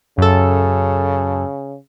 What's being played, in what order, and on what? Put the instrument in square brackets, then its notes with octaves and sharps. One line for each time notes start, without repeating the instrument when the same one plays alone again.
[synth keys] F#2 A4 [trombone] C#3